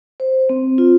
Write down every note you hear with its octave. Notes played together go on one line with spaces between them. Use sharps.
C5
C4
F4